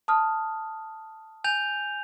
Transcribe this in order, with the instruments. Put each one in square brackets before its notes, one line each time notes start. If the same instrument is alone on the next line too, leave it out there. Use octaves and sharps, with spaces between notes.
[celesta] A5 D#6 F6
[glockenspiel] G#5 G6 F7